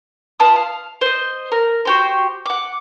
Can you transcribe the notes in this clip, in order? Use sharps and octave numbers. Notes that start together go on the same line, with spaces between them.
F4 B4 A5 D#6
F5
C5 D#5
A#4
F#4 G4 C5
F#5 D6